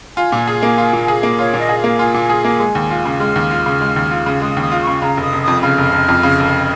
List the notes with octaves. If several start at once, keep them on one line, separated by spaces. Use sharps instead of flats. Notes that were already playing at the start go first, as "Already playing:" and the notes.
F4 G#5
A#2
G#4
A#3
F4
A#2
G#4
A#3
F4 C#5
A#2
D#5
G#4
A#3 F5
F4 G#5
A#2
G#4
A#3
G#3
D#2
F4
C#3
G#3 F6
D#2
F4
C#3
G#3
D#2
F4
C#3
G#3 D#6
D#2
D#6
F4
C#6
C#3
C#3 A#5
F1
D#6
F1
F2 D#6
C#3 F6
F1
F1
F2
C#3
F1